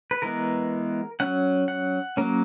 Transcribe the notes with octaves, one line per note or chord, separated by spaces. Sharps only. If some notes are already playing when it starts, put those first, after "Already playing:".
B4
E3 G#3 B3 A#4
F#3 C#4 F#5
F#5
F#3 A#3 C#4